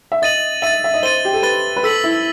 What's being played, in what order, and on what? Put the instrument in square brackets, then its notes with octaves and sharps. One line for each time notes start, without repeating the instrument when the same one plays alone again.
[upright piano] E5
[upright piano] D#5 [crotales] A6 D#7 F#7
[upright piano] E5 [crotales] A6 D#7 F#7
[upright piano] E5
D#5
[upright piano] C5 [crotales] A6 D#7 G7
[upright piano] G4
A4
[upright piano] B4 [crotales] A6 D#7 G7
[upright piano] B4
[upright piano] A4 [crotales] E6 B6 F#7
[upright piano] E4